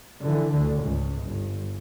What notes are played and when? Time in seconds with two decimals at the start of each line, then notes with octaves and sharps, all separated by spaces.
0.21 D3 E3
0.51 D2 D3
0.82 C#2 G#2
1.23 G1